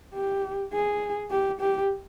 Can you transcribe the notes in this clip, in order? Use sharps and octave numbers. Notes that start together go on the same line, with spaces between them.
G4
G#4
G4
G4